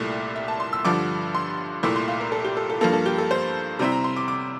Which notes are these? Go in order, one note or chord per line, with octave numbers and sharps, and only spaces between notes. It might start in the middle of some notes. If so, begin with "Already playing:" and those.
Already playing: C2 A#2 A3 E4 D5
E5
A5
C6
E6
G2 D3 F3 D6
C6
C2 A#2 A3 E4 D6
C6
F5
A#4
A4
G4
A4
A4
G2 F3 A#3 A4
A4
G4
A4
C5
C3 G3 C4 E4 A#5
A#5
C6
D6
D6